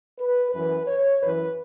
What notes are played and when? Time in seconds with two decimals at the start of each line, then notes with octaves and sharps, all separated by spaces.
0.18 B4
0.52 F#2 E3 B4
0.87 C#5
1.21 F#2 E3 B4